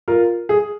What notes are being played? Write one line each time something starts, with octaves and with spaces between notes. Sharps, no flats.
F4 A#4
G#4